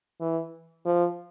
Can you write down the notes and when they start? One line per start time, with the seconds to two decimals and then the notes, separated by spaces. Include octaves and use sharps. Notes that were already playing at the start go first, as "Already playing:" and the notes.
0.21 E3
0.85 F3